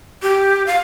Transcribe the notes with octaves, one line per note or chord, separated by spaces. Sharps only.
G4
F5